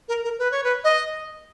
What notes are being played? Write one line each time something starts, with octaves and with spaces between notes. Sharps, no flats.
A#4
A#4
B4
C#5
B4
D#5